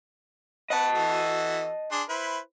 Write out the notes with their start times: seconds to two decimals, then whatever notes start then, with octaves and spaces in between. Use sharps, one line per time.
0.70 B4 D#5 F#5 A5
0.95 E3 F#4 A4
1.92 D4 G#4 C6
2.09 E4 B4 C5